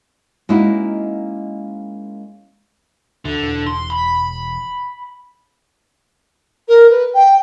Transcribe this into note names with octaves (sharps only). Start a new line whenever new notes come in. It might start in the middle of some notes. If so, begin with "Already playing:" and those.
G#3 A#3 C#4 D#4 E4 F#4
D2 D3
E1
C6
B5
A#4
B4
G5